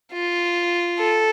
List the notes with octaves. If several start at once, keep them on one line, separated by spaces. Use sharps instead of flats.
F4
A4